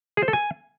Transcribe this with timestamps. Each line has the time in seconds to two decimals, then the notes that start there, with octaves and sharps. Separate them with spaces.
0.17 G#4
0.23 C5
0.28 A4
0.33 G#5